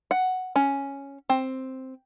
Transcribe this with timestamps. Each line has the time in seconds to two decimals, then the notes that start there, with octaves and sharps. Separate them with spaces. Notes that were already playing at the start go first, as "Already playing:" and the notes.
0.11 F#5
0.56 C#4
1.29 C4